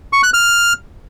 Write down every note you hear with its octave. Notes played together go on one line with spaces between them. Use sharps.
C#6
F#6
F6